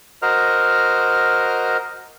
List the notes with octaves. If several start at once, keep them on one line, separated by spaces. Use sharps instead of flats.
F#4 A#4 C5 D#5 F6